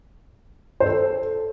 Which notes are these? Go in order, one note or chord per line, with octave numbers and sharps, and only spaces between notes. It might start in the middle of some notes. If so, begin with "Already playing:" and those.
C5
A4